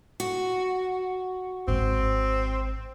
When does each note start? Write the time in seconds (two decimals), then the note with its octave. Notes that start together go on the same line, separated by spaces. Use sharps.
0.20 F#4
1.68 G#1 C4